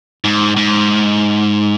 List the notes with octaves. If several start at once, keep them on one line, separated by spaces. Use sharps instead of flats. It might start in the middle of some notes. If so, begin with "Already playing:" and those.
G#2
G#2